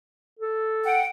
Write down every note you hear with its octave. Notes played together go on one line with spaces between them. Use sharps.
A4
F#5 G5